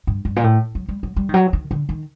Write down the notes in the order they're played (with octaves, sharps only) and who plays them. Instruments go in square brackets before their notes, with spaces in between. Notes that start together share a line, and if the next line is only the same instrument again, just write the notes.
[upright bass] G2
G2
A#2
A2
F#3
G3
F#3
G3
D#3
F#3
D#3
D3
D#3